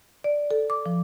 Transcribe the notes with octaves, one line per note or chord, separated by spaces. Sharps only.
D5
A4
D6
F3